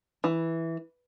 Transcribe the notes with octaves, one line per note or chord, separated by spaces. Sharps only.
E3